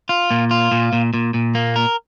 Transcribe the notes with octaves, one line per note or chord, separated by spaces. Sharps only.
F4
A#2
F4
A#2
A#2
A#2
A#2
A#3
A#4